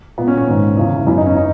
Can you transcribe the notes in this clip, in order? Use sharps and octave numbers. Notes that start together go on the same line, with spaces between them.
A#2 B3
C#4
C#4
G#2 D#3
E2 C#3 E3
F#2 E3 E4
D#4
C#4
D#4